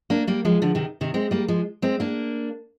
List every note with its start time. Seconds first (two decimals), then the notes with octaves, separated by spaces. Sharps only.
0.10 A#3 D4
0.27 G3 A#3
0.45 F3 G#3
0.62 D3 F3
0.75 C3 D#3
1.01 C3 D#3
1.14 G#3 C4
1.31 G3 A#3
1.48 F3 G#3
1.82 G#3 C4
2.00 A#3 D4